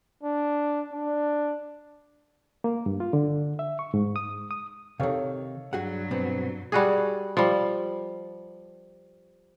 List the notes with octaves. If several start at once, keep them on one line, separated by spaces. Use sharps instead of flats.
D4
D4
A#3
G2
F4
D3
E5
C#6
G#2
D#6
D#6
C3 D#3 A4 C#5 F5
G2 F#3 F#4 G#4 F#5
B2 B3 C4
G3 F#4 G#4
F3 G3